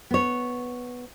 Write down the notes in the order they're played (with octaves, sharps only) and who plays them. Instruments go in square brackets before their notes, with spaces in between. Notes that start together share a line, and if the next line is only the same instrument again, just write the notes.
[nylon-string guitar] B3 C#5